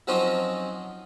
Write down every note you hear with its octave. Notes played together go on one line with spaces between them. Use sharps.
F3 F#3 C4 C#4 D#4 C5